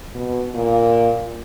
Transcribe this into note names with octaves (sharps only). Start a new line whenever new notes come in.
B2
A#2